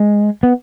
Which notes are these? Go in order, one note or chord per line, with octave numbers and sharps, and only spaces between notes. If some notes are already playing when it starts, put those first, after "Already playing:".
Already playing: G#3
B3